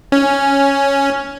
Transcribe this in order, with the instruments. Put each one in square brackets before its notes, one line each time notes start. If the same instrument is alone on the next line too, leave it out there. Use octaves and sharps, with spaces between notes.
[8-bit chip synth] C#4